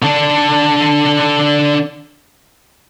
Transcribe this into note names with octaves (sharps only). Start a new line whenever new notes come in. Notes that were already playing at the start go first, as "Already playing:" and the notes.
D3 D4